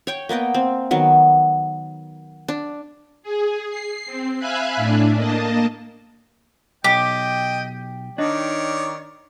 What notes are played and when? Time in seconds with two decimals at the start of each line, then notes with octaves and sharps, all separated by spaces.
0.07 C#5 G5 C#6
0.29 A#3 B3 D#5 G5
0.54 C4
0.91 D#3 F#3 B3
2.48 D4
3.23 G#4
3.69 C7
4.06 C4
4.39 E5 F5 G#5 B5 F#6
4.76 A2 D4
5.16 A#3 D#5 A5
6.84 B1 G4 D#5 G5
8.18 D#3 D4 D#4 C#5 D5